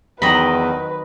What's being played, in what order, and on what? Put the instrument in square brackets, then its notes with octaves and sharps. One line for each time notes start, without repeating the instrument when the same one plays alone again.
[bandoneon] E2 [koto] D#3 F#3 C4 [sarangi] B4 [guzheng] D#5 B5